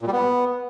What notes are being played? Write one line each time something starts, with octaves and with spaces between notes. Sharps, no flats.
A#2
G3
B3